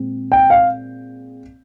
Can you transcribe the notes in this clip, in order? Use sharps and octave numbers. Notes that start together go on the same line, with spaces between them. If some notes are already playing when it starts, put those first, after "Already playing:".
Already playing: A#2 G#3 C4
G5
F5